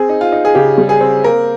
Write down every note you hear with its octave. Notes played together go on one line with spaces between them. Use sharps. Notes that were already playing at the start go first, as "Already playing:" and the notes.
Already playing: C4 G#4
D#4
F4
D#4
G#4
C#3 G4
G3
G#4
C4
A#3 A#4